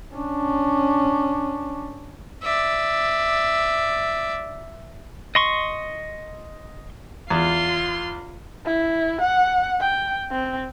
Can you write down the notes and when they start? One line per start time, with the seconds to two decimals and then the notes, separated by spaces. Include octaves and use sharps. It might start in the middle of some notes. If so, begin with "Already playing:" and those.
0.14 C#4 D4
2.43 D5 E5
5.35 D#5 C6 C#6
7.30 E2 F4 C6
8.66 E4
9.21 F#5
9.81 G5
10.32 C4